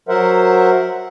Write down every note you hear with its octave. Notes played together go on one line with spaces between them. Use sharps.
F#3 A#4 C5 E5 F#5